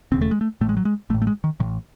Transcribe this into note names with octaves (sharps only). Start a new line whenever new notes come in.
E1 D#2 C#3 C4
A3
G#3
A3
A1 A2 A3
G#3
F#3
G#3
A1 A2 A3
A3
G#3
D#3
A1 A2 D#3